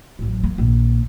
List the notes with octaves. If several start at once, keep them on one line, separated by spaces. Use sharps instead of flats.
A1 F#2
A#3
A#1 D#2